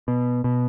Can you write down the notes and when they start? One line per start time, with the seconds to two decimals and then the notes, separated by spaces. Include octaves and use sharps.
0.08 B2
0.44 B2